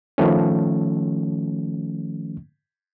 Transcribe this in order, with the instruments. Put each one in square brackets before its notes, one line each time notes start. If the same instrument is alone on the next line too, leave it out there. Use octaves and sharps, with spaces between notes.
[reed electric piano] D#3 F3 A3 C#4